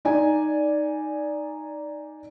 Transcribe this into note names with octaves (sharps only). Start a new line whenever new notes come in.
D#4 D5 G#5